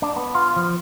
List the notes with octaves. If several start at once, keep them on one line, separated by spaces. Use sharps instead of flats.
D4
B3
F4
F3